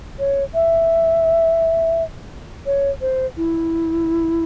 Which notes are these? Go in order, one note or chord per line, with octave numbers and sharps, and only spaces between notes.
C#5
E5
C#5
C5
E4